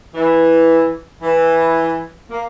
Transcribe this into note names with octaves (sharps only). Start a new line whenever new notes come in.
E3
E3
A#3